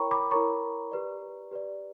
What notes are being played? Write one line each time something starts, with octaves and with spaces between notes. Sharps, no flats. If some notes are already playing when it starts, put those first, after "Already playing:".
Already playing: E4 A#4 C#5 G5 A#5 B5 C#6
B5 D6
E4 A#4 C#5 A#5 C#6
G4 B4 D5
G4 B4 D5